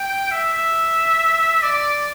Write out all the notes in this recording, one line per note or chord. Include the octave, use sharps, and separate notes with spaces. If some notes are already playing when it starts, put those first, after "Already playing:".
Already playing: G5
E5
E5
D5